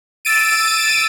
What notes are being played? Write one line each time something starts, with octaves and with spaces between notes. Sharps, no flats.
E6 A6 D7 D#7